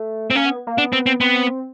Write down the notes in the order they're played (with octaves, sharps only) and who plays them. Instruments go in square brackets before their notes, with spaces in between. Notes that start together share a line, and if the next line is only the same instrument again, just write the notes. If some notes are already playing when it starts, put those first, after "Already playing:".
Already playing: [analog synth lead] A3
[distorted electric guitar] C4
[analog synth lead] A#3 [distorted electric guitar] C#4
[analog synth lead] B3
A#3
[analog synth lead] B3 [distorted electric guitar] D4
[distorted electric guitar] C4
C4
[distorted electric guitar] B3 [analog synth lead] C4